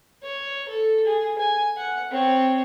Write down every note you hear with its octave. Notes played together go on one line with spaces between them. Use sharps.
C#5
A4
G#4
G#5
F#5
C4 C#5